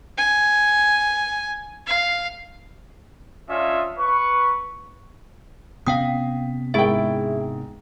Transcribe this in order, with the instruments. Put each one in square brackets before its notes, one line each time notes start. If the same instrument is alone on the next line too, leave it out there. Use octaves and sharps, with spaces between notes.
[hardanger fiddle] G#5
F5
[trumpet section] C#4 D4 F4 D#5 E5
B4 C#6
[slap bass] C3 B3 C#4 [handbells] F5 G5 D#6 [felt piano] B6
[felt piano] G#2 G#3 A#4 [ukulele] E4 G5 [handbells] G#4 E5